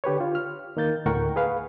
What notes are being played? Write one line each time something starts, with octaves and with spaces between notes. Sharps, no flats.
D3 G4 B4 C#5
F4
F6
D#3 A#3 G6 A6
D2 A2 A#4 F#5 G5 C#6
G#4 B4 F5